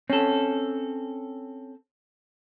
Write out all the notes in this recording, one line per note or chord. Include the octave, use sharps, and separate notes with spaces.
C4 C#4 A4